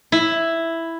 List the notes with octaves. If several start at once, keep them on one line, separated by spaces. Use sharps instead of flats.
E4